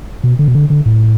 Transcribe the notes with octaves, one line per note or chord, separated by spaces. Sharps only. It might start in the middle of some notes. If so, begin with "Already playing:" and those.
B2
D3
B2
D3
D3
A2